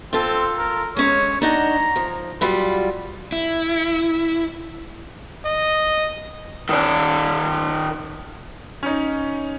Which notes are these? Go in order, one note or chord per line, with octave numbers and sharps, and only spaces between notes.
C4 F4 A4
A#4
G#3 C#4 C#5
D4 D#4 F#5 A#5
F3
F#3 G3 F4 B5
E4
D#5
D#3 D5
C#4 D#4